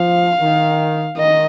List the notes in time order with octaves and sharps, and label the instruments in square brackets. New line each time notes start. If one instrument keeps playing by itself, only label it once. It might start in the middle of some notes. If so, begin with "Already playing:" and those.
Already playing: [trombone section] F3 [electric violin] F5
[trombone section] D#3
[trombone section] D#3 [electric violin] D#5